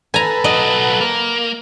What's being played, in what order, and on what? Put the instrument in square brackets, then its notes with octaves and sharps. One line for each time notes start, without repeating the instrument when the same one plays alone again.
[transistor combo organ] A4 B4 [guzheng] G#5 A#5
[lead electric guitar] B1 F#3 [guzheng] D#5
[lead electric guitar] A#3